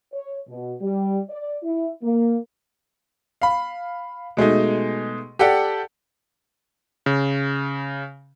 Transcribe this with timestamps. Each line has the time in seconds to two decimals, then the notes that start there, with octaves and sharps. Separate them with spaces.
0.14 C#5
0.48 B2
0.82 G3
1.30 D5
1.64 E4
2.03 A#3
3.42 F5 B5
4.37 B2 G#3 A3 D#4
5.39 G4 A4 D5 F#5 G5
7.06 C#3